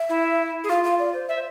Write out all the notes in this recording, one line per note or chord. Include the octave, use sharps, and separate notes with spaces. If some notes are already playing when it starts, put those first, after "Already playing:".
Already playing: E5
E4
G#4
F4 F5
F5
D5
C5
E5